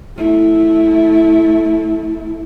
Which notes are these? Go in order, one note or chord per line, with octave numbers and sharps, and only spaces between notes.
A3 E4